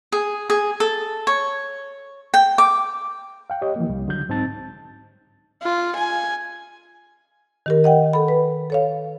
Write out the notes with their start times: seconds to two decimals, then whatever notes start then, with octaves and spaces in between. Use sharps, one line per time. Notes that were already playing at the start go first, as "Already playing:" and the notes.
0.12 G#4
0.50 G#4
0.80 A4
1.27 C#5
2.34 G5
2.58 D6
3.50 F5 G5
3.62 G4 C#5 D#5
3.76 E3 F3 A#3
3.90 C2 G3
4.08 D3 F#3 G6
4.29 G#2 C4 D#4 A5 A6
5.63 F4
5.95 G#5
7.66 D#3 G4 A#4
7.84 D#5 F#5 G5
8.13 A4 B5
8.28 B4
8.70 A4 C#5 F5